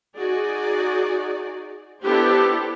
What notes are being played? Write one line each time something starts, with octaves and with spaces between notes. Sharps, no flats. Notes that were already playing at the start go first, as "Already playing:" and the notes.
D#4 F#4 G#4 D5
B3 D4 E4 G4 A4 C5